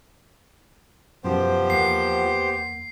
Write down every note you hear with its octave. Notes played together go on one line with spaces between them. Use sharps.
F#2 B2 F3 B3 G4 C5
E2 A#3 F#5 C7